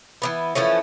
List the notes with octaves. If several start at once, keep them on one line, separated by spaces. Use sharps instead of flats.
E3 F3 B3
E3 F3 A3 C#4